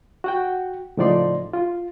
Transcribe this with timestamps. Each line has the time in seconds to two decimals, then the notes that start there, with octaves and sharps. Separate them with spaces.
0.24 F#4 F#5 G5
0.97 A2 C#3 F3 D#4 D5 C6
1.53 F4